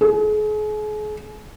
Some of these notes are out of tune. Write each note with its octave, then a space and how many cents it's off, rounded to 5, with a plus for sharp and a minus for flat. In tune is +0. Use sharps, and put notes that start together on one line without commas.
G#4 +40